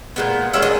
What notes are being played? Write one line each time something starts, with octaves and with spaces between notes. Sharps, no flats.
A#2 G#3 B3
D#3 G#3 C#4 E5
D#5